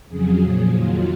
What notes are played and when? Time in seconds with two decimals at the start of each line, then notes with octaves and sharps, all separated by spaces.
0.09 F2 C#3 F#3 G#4
0.42 A#2 F3 G#4
0.74 F2 D#3 F#3 F4